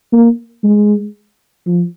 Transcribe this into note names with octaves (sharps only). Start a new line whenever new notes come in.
A#3
G#3
F3